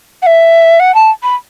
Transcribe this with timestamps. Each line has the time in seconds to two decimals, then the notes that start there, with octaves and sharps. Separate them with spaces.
0.22 F#5
0.26 E5
0.79 F#5
0.94 A5
1.23 B5